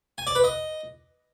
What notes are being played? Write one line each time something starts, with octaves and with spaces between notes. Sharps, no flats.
G#5
D5
B4
D#5